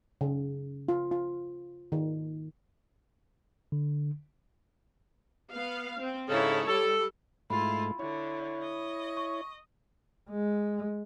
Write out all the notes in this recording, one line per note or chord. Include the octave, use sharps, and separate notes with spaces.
C#3
F4
F4
D#3
D3
B3 F5
C4
G#2 C#3 E4 A4 C#5
G3 A4
G#2 A3 E4 F4 B5
D3 E4 C#5
D#5
C#6
G#3